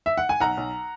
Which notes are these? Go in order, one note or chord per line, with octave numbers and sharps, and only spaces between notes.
E5
F#5
G#5
B1 F#5 A#5
B1